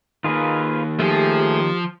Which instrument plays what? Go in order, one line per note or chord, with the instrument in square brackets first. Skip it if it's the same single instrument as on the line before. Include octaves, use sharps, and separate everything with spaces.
[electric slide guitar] D#3 A#3 [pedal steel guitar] F4 G#4 B4
[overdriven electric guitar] F3 [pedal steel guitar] A3 G#4 [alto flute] G4